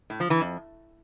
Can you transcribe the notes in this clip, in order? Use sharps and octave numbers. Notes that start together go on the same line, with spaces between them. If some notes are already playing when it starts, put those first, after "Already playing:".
A2
F3
E3
F2